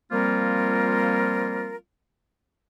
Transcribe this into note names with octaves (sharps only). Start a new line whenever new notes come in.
F3 G3 A#3 C4 F4 A#4